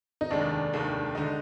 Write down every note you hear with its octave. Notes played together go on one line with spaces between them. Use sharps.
D#4
F1 D#2 D#3 G#3 D4
F1 D#2 D#3 G#3
D3 G#3 D#4